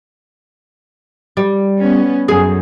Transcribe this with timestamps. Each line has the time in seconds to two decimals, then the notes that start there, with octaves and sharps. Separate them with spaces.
1.37 G3
1.79 B3 C#4
2.28 F#2 G#4